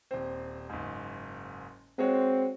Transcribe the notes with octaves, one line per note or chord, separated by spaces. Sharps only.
D#1 C4
F#1 G#2
G#3 C4 F#4 C#5